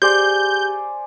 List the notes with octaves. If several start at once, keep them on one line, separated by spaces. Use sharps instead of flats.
G4 G#4 C5 D5 G#5 G6